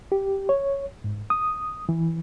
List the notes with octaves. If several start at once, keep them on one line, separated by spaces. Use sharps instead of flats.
G4
C#5
G#2
D#6
E3